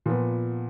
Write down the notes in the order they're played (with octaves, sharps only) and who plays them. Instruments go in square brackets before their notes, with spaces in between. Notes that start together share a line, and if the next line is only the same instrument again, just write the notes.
[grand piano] A#2 F3 B3